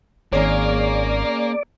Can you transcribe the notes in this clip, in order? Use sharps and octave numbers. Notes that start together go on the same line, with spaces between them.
G#1 A#3 C#4 G#4 A#4 C#5 D5